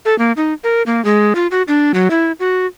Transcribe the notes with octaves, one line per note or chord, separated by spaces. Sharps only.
A4
A#3
D#4
A#4
A#3
G#3
F4
F#4
D4
F#3
E4
F#4